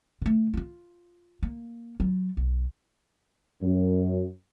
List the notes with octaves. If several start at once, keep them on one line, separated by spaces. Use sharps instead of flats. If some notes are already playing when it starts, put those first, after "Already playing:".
D3 A3
E4 F4
A#3
F#3 F4
B1
F#2